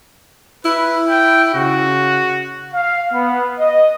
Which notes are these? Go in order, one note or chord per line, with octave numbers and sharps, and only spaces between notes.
E4 B4
G5
C#3 F#4
F5
B3
D#5